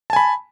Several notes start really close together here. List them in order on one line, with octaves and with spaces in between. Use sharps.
A5 G#5 B5